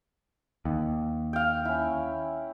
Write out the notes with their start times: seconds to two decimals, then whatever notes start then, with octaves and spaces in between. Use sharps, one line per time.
0.65 D#2
1.33 F5 G5
1.65 C#4 E4